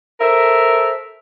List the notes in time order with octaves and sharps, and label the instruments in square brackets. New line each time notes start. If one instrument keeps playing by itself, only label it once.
[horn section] A4 C5 E5 [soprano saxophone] A#4